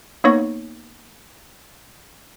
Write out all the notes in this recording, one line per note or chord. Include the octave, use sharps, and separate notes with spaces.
A#3 B3 D#4 C#5 C#6 A#6